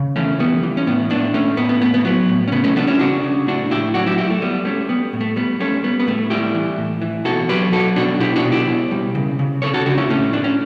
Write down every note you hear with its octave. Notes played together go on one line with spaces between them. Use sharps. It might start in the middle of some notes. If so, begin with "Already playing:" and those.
Already playing: C#3
E3 A3 C#4
G3 B3
E3
C#4
A2 B3
A2 B3 D4
A2 A3 C#4
A2 B3
B3
A2 B3
B3
F#3 B3
A2
C#4
C#3 B3
A3 C#4
G3 B3 D4
C#4 E4
C#3 D4 F#4
C#3
A2 D4 F#4
A2 E4 G4
F#3 D4 F#4
E4 G4
F#3 E4 G4
A3
G3 B3
G3 A3 C#4
G3 B3
A2
A3
G3 B3
G3 A3 C#4
G3 B3
B3
A2 A3
G3 E4 G4
E3
A2
E3
B2 F#4 A4
F#3 G4 B4
F#3 F#4 A4
B2 D4 F#4
B2 E4 G4
D4 F#4
B2
E4 G4
B2
G3
C#3
C#3
C#3 A4 C#5
F#4 A4
C#3 D4 F#4
C#4 E4
A2 A3 C#4
A2 D4
C#4